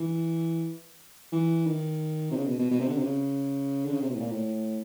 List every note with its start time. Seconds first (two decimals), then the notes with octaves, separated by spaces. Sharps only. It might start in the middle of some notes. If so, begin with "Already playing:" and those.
Already playing: E3
1.32 E3
1.66 D#3
2.31 C3
2.37 C#3
2.47 B2
2.59 B2
2.71 B2
2.80 C3
2.88 D3
2.97 C3
3.05 C#3
3.86 D3
3.93 C#3
4.01 C3
4.09 B2
4.16 A2
4.20 A#2
4.31 A2